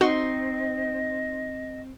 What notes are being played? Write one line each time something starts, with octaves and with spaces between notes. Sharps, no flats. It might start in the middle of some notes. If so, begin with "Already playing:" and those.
C4 D#4 F#4 D#5 C6 C#6